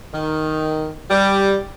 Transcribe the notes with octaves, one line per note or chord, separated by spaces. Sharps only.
D#3
G3